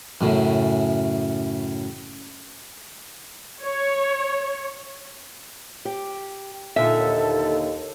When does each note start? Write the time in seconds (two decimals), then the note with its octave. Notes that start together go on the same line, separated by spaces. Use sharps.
0.21 F#2 A2 C#3 E4
3.61 C#5
5.85 G4
6.76 A#2 D3 D#4 A4 E5
6.99 D#2